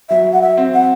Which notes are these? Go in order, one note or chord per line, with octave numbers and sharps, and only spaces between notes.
F#3 E5
F#5
E5
C4
F#5